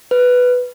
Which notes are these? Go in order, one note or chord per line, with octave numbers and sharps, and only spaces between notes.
B4